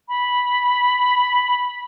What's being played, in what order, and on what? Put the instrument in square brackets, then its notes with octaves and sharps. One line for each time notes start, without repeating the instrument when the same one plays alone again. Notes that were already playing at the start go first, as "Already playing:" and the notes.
[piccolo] B5